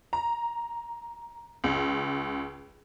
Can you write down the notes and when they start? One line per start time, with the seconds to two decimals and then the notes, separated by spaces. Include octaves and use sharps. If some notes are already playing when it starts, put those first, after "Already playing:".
0.13 A#5
1.64 C#2